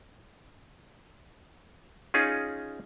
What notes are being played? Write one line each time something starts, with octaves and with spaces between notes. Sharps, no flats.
C#4 D#4 F4 G#4